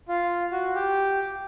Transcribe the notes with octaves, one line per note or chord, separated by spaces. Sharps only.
F4
F#4
G4